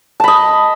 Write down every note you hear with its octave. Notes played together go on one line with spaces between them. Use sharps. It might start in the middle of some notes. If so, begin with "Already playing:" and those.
D#5 A5 B5